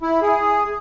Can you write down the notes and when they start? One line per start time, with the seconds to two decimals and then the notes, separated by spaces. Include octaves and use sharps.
0.02 E4
0.22 G#4